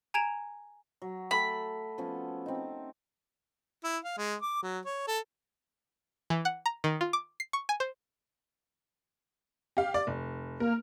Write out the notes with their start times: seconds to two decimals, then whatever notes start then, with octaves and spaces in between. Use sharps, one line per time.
0.14 G#5 A#5 G#6 D7 E7 F7
1.02 F#3
1.31 A3 A4 B5
1.98 F3 B3 C#4
2.46 C4 D#4
3.84 E4
4.04 F5
4.18 G#3
4.41 D6
4.62 F#3
4.85 C#5
5.07 A4
6.30 E3
6.45 F#5
6.66 A#5
6.84 D#3
7.01 F4
7.13 D6
7.40 C7
7.53 C#6
7.69 G#5
7.80 C5
9.77 G4 F5
9.94 D5
10.07 F1
10.60 A#3 A#4 F6